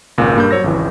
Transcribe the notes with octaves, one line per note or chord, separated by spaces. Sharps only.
G#1 C#2 A#2
G2 A#3 B5 G6
F#3 C5 C#5 E6 A#6
G#1 C#2 E3